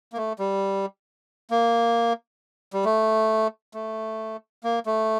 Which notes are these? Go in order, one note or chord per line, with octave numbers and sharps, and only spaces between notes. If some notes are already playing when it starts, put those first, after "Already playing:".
A#3
A3
G3
A#3
G3
A3
A3
A#3
A3